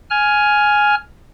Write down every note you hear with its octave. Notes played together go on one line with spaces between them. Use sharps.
G#5 F6